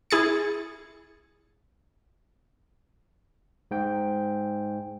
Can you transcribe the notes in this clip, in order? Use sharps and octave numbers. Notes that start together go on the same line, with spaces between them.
E4 G#4 A6 C#7
G#2 G5